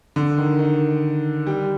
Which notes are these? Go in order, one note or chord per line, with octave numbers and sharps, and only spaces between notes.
D3
D#3
D#3
G3